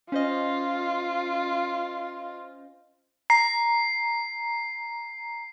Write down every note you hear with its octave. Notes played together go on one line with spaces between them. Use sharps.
C#4 F4 C5 D#5
A#5 C7